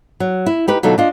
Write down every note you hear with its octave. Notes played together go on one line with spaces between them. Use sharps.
F#3
E4
D#4 G4 B4
B2 D3 F#3 D#4 F4 A4
D4 F4 D#5